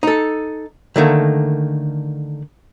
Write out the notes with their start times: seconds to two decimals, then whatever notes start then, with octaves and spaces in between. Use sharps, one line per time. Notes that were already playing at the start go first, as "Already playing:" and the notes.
0.03 D#4 A4
0.96 D3 D#3 A3 A#3